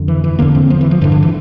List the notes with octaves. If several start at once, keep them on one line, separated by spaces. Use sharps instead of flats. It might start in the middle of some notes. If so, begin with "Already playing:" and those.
Already playing: F2 D3
E3
E3
E2 D3 A#3
C4
F3
E3
F3
G2 D3 E3
D3
E3